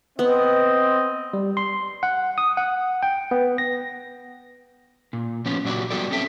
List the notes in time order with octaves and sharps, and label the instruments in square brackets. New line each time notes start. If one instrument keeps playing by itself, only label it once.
[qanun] B3 [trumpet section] C4 D#5
[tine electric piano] G3
C6
F#5
D#6
F#5
G5
B3
A#6
[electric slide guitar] A#2
F3 B3 C#4
A#2 F#3 D4 F#4 G4
G3 B3 F#4 G4 A4 D5
C4 C#4 A4 E5 G5